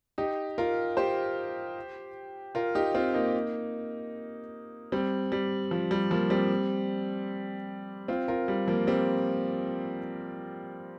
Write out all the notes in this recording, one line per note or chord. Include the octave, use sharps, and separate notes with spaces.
D#4 G4
F4 A#4
G4 C5
F4 A#4
D#4 G4
C4 F4
A#3 D#4
G3 C4
G3
F3
G3
F3 A#3
G3 C4
C4 F4
F4 A#4
G3
F3 A#3
G3 C4